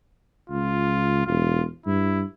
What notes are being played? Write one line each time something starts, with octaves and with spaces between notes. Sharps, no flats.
C#2 F4
E1 F4
G2 E4